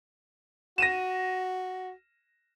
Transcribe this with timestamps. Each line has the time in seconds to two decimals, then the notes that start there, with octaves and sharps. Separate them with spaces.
0.78 F#4 A#6 D#7 E7